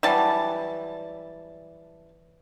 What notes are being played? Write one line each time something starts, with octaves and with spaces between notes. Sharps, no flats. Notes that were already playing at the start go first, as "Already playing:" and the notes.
E3 F#3 G3 A5